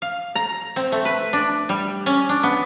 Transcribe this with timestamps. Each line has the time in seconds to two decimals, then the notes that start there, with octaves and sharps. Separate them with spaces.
0.02 F5
0.35 A#5
0.76 C4
0.92 A3
1.05 B4
1.33 D4
1.69 G3
2.06 C#4
2.29 D4
2.43 B3